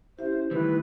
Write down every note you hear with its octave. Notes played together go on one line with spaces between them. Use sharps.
C#4 E4 G4 C5 E5
D#3 E3 G3 A3 E4 B4